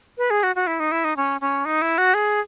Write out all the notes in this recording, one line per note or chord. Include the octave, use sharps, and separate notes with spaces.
B4
G#4
F#4
F#4
E4
D#4
E4
D#4
C#4
C#4
D#4
E4
F#4
G#4